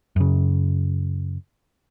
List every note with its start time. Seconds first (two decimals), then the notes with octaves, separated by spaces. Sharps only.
0.16 F#2 C#3